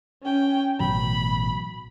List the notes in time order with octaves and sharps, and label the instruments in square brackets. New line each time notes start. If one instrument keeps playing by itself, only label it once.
[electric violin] C#4 G5
[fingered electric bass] A1 B2 F#3 [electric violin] B5